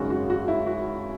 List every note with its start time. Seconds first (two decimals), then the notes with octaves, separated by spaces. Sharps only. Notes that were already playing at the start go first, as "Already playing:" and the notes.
Already playing: G#1 F#2 C#3 G#3 C#4 F#4
0.10 F#4
0.30 F#4
0.48 E4
0.67 F#4